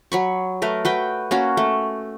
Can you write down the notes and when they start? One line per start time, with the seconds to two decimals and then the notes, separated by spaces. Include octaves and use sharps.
0.12 F#3 B5 C#6
0.62 A3 A#4 B4
0.85 F#4 B4 G5
1.31 A#3 C#4 F#4
1.57 A3